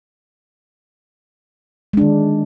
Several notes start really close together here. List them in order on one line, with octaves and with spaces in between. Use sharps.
G#3 D4 D#3